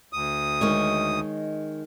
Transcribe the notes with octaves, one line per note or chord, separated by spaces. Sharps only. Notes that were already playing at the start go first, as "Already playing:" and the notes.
D2 D#6
D#3 G#3 C#5